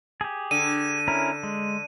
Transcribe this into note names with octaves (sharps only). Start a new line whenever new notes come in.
G4 G#4
D3 D#7
C#4 E4 A#4
G#3